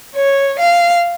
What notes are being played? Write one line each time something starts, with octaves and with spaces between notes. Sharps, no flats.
C#5
F5